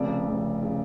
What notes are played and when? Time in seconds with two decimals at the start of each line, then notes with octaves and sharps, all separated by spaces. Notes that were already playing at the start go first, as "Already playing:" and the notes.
Already playing: F1 F2 C#3 D5
0.26 F1 F2 C#3
0.63 C#3